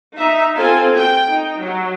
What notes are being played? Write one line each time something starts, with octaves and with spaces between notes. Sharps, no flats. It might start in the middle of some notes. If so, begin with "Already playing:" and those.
D#4 E5
C4 F4 A4 G#5
G5
D#4
F#3